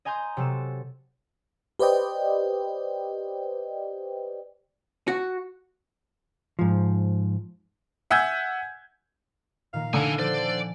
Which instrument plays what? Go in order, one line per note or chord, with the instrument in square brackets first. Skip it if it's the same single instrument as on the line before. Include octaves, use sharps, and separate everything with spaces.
[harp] D#5 G#5 A#5 C6 G6
C3 F#3 A4 E7
[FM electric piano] G4 B4 C5 D5 D#5 G5
[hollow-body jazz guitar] F#4
G#2 F3
[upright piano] E5 F#5 G#5 E6 G6 G#6
[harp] A#2 D#3 A#3 [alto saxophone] F5
[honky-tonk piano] D3 [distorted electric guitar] E4 G#5 [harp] A#6 D7
[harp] F3 [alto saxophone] C5 [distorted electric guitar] D5
[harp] G#5